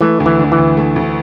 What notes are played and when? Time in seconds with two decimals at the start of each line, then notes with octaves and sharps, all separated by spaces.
0.01 E3 A3
0.20 D2
0.26 E3
0.39 D3
0.52 E3
0.58 D2
0.77 A3
0.96 D2